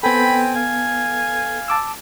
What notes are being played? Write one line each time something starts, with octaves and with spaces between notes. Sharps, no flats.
B3 C4 A4 G5 G#5 B5
F5 G#5
A5 D6 E6